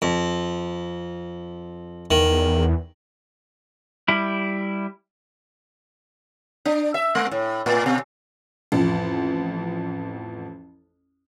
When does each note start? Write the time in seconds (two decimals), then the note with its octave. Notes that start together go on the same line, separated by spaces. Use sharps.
0.02 F2
2.11 E2 D#3
4.08 G3 E4
6.65 D4
6.94 E5
7.15 G#3
7.31 A2
7.66 A2
7.86 B2
8.72 A1 F2